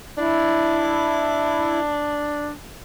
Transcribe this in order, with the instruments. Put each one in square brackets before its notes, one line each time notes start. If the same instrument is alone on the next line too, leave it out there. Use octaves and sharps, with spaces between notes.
[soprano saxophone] D4 [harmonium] E4